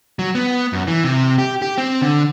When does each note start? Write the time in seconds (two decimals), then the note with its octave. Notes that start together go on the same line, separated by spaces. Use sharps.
0.19 F#3
0.35 B3
0.73 F#2
0.87 E3
1.04 C3
1.38 G4
1.62 G4
1.78 C4
2.02 D3